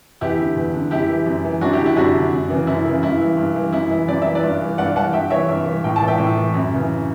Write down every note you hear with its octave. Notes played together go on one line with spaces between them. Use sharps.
E2 E4 G4
D3
E2
D3
F#2 E4 G4
E3
F#2
E3
F#2 D4 F#4
E4 G4
D3
E4 G4
F#2 D4 F#4
D3
F#2
C#3 E3
F#2 E4
C#3 E3
G2 E4
E3
G2
E3
F#2 E4
E3 E4
F#2 D5
E3 E5
B4 D5
G2
E3
G2 D5 F#5
E3 F#5 A5
G2 E5 G5
E3 C#5 E5
G2
E3
A2 G5
A5
E3
E5 G5
A2
E3
F#2
C#3 E3